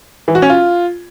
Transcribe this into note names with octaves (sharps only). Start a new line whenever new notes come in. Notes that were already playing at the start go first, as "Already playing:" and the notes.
E3
F#4
C#4
F4